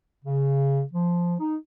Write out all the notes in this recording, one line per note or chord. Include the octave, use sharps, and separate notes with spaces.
C#3
F3
D#4